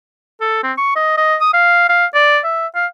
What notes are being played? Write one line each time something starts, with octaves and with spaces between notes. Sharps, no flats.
A4
C4
C#6
D#5
D#5
D#6
F5
F5
D5
E5
F5